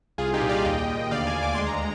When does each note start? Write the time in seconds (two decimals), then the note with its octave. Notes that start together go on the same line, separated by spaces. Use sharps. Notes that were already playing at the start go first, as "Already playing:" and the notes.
0.18 C2 F4 G#4
0.34 D#4 G4
0.41 A#2
0.49 D5 F5
0.65 D#2 D#5 G5
0.88 D#2
1.11 D2 D5 F5
1.27 F5 G#5
1.34 D2
1.42 D6
1.55 G#3 C6
1.67 A#5